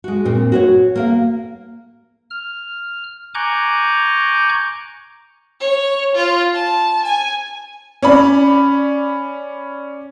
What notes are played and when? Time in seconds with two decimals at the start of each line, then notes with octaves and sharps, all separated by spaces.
0.04 G#3 F#4
0.25 A#2 C4
0.52 F#4 C5 C#5
0.95 A#3 A#4 F5
2.30 F6
3.35 G#5 A#5 C#6 D6 F#6 G6
5.60 C#5
6.15 F4
6.54 A5
7.04 G#5
8.02 C#4 D5 B5